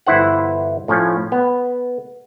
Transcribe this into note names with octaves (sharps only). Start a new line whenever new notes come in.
G1 E3 E4 C5 F#5
A2 F3 C#4
B3